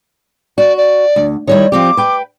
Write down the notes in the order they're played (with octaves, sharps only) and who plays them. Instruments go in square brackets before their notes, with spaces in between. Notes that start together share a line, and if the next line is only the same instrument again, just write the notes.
[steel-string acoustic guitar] F#4 [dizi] D5
[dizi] D5
[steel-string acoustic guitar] D2
[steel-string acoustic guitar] D#3 G3 E4 [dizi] C#5
[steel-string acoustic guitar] F3 C4 G4 [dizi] D6
[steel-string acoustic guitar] B4 G5